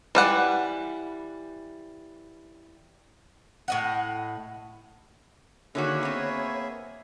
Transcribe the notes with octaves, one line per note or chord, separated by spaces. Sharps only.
E3 G3 F#5
A2 D#5 F#5
D3 D#3 A#3 F#4 G#4 C#5 E5
B3 C4